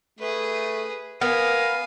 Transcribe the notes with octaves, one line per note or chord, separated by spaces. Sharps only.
A3 G#4 B4
B3 A#4 F5 G#5